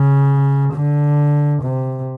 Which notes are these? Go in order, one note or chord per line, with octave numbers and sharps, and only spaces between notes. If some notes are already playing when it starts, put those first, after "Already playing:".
Already playing: C#3
D3
C3